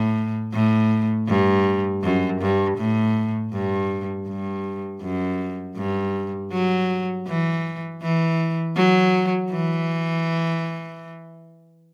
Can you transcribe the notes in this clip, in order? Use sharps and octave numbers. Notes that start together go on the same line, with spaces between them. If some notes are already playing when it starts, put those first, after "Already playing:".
Already playing: A2
A2
G2
F#2
G2
A2
G2
G2
F#2
G2
F#3
E3
E3
F#3
E3